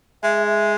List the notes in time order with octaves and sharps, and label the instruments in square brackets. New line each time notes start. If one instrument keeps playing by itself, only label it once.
[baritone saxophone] G#3 [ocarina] E5
[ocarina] E5